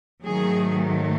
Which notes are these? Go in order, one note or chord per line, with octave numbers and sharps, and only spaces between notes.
G#2 D#3 F#3 A3 G#4